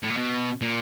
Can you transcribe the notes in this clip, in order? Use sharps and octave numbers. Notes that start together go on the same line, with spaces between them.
A2
A#2
B2
A#2